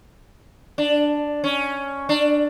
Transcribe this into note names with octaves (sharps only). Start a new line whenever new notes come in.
D4
C#4
D4